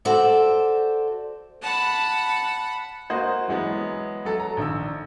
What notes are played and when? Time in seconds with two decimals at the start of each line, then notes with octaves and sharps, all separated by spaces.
0.05 F#4 A4 C5 D5 E5
1.63 F#5 A5 B5
3.10 A#3 F#4 C5 D#5
3.48 E3 F#3 G#3 B3
4.25 F#3 A4
4.40 A#5
4.57 A#1 D#3 E6